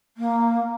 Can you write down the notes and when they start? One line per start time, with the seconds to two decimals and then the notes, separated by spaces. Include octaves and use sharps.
0.16 A#3